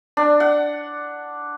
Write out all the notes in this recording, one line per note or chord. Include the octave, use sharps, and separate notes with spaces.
D4
F#5